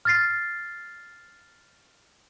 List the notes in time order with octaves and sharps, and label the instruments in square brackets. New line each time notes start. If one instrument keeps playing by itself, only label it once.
[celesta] F6 A6 C7